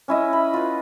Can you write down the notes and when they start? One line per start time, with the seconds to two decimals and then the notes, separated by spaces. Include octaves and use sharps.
0.08 C#4 E4 D#5 E5
0.33 B5
0.54 F4 B4